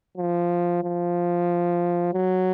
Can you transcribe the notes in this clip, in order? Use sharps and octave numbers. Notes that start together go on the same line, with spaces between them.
F3
F3
F#3